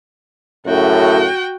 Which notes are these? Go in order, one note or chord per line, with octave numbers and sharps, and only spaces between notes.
F#2 A2 C#3 F#4 G5